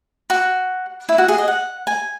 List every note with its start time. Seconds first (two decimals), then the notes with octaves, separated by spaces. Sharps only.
0.30 F#4
1.09 E4
1.18 F#4
1.28 G#4
1.38 D#5
1.48 F#5
1.87 G#5